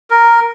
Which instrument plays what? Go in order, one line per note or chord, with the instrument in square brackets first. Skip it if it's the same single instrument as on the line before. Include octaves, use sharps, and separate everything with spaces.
[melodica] A#4